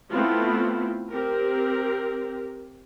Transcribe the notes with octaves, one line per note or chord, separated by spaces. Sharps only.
A3 B3 C4 E4 F4
C4 G4 A#4